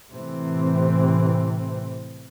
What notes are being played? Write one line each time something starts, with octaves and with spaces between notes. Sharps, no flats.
A2 C3 E3 C4